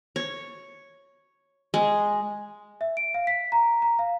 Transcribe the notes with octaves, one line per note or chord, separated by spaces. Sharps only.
C#5
G#3
E5
D7
F5
B6
A#5
A#5
F5